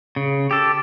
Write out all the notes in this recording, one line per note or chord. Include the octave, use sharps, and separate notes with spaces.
C#3
G4 A4